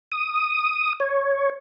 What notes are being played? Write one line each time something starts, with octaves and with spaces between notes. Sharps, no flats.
D#6
C#5